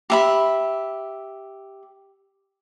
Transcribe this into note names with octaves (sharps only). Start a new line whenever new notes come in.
G4 E5 B5